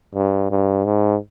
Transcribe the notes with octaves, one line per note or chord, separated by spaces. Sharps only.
G2
G2
G#2